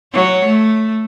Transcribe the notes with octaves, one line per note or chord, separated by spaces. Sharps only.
F#3 C#5
A3